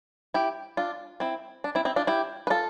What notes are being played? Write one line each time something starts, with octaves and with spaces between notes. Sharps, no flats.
E4 G4
D4 F4
C4 E4
D4
C4 E4
C4 E4
D4 F4
E4 G4
B4
F4 A4